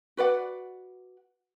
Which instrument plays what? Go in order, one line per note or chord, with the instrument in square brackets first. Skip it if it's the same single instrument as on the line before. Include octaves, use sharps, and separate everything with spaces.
[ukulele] F#4 B4 D5 F#5